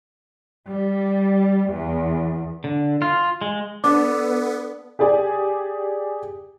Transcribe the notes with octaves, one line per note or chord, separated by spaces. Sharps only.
G3
E2
D3
F4
G#3
B3 D4 A4 D6
G4 G#4 D5 G#5